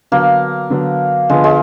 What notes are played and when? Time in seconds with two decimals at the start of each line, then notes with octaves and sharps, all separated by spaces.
0.12 D3 F#3 A#3 B3 D4
0.70 D3 F#3 B3 D4
1.30 D3 F3 G#3 B3
1.44 G#3